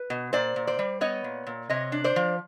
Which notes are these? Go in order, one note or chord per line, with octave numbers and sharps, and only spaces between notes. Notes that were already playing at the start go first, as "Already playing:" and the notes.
Already playing: B4
B2
A#2 C5 D5
A#2
C5 D5
G3
B3 C#5 D#5
A#2
A#2
C3 C#5 D#5
D4
C5 D5
F3